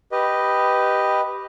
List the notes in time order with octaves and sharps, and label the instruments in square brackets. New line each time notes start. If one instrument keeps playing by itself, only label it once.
[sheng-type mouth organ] G4 B4 D#5